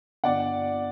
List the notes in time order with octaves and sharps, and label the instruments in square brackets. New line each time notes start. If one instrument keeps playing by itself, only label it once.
[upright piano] G1 D5 F#5